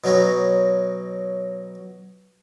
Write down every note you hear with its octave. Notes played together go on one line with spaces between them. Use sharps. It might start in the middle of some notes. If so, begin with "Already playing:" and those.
B2 F#3 C#4 D#4